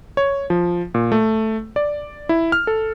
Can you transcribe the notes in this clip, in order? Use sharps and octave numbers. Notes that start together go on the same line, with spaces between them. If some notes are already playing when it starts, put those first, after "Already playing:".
C#5
F3
A#2
A3
D5
E4
F6
A4